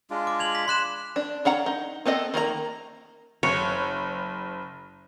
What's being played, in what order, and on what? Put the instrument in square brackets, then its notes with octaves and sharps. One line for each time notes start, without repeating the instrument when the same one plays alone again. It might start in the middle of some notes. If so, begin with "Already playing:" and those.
[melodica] G#3 D4 F4
[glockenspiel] D6
G#6 F7 F#7
B6
[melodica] B5 [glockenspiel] C6 F#6 E7
[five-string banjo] D4
C#4 D4 F#5 A#5
D#4
B3 C4 A4 D#5
D#3 A#3 F#4 A#5
[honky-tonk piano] F#1 [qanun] C#5